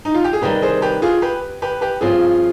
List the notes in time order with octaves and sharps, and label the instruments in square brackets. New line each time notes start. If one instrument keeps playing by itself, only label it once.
[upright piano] D#4
F4
G4
G#4
[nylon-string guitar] C3 D#3 G3 [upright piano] G4 B4
[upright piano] G#4 C5
G4 B4
F4 G#4
G4 B4
G4 B4
G4 B4
[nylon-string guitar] G2 F3 C4 [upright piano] F4 G#4